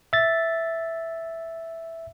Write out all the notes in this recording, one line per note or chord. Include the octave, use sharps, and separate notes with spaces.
E5 A6